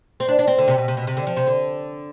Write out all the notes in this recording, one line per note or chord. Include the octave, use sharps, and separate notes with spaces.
C4
D4
D4
C4
D3
C3
B2
C3
B2
C3
D3
F3
C3
D3